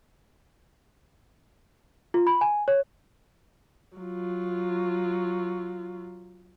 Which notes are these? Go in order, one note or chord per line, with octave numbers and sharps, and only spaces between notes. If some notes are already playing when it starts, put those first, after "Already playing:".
F4
B5
G#5
C#5
F#3 F4